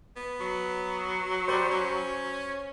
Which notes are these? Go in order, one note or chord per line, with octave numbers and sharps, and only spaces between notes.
B3
F#3
G3 C5
C#4